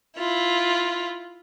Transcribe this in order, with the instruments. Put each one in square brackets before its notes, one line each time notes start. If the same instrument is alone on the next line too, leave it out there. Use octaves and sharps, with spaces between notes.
[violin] E4 F4